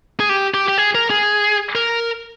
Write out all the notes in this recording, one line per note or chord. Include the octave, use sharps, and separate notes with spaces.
G#4
G4
G4
G4
G#4
A#4
G#4
A#4